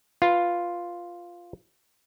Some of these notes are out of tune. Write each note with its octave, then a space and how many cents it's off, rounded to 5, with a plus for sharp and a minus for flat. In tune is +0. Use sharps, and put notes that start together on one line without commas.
F4 +0 B4 +0